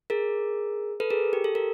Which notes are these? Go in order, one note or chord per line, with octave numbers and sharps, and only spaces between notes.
G#4 A#4
A4 B4
G#4 A#4
G4
A4
A#4